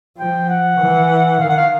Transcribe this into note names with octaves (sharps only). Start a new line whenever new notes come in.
F3 G5
F#5
E3
D#3 F5
F#5
F5